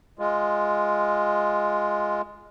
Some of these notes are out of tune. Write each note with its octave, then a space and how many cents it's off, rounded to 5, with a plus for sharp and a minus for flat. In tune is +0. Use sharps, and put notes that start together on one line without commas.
G#3 +0 F4 +0